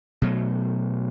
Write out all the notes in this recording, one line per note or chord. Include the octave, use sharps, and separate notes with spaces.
B2 F#3 A3